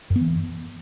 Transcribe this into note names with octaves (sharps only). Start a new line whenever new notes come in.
F#2
B3
E3